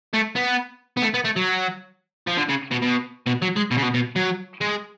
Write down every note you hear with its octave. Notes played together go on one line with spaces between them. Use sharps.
A3
B3
B3
A3
B3
A3
F#3
F3
D3
C#3
B2
B2
B2
F#3
G#3
B2
C#3
B2
B2
F#3
G#3